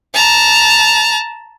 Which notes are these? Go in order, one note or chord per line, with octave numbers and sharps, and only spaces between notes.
A5 A#5